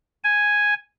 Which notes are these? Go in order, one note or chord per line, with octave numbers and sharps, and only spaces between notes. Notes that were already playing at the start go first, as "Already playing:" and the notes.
G#5